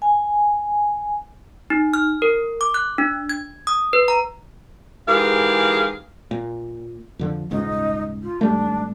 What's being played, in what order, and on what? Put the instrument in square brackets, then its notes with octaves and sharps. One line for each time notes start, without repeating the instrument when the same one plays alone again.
[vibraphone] G#5
[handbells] D#4
F6
A#4
D6
F#6
D4
G#6
D#6
B4
A#5
[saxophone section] G#2 E3 G4 G#4 A#4 F5
[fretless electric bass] A#2
F2 D3 F3
[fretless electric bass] D#1 C#2 G#2 [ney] D#4
[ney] F4
[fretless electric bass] G#1 G3 A3 [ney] D4